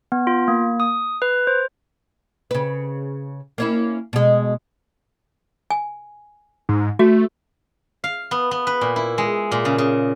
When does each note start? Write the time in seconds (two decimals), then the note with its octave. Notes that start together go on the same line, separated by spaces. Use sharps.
0.12 B3
0.27 F4
0.48 A#3
0.80 D#6
1.22 B4
1.47 C5
2.51 C#3 B4
3.58 A#3 C#4 E4
4.13 B2 G#3
5.70 G#5
6.69 G#2
6.99 A3 F#4
8.04 F5
8.31 B3
8.51 B3
8.67 B4
8.81 A#2
8.96 E4
9.18 G#3
9.52 A#2
9.65 C#3
9.78 C#3